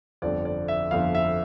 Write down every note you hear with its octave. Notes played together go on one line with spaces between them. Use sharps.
G1 F2 D3 F3 D5
D5
E5
G1 F2 D3 F3 F5
E5